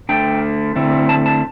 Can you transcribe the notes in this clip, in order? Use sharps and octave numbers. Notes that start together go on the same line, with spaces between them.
D3 A3 D4 G5
D3 A3 C4 E4
A5
A5